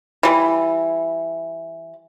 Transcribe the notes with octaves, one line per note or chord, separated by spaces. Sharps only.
E3 G3